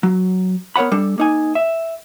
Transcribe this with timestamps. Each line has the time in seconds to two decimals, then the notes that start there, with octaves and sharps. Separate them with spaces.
0.03 F#3
0.76 B3 A#4 C#5 F#5 B5
0.91 G3 D4 A4
1.18 A#3 D#4 G#5
1.55 E5